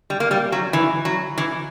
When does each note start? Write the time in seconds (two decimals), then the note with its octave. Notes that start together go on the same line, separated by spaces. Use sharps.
0.10 G3
0.20 A#3
0.31 G3
0.52 F#3
0.73 E3
1.05 F#3
1.38 E3